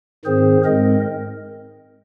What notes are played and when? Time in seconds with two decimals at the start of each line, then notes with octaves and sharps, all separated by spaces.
0.25 G#2 D#3 C4 G#4 C5
0.64 G#2 G#3 C4 A#4 D#5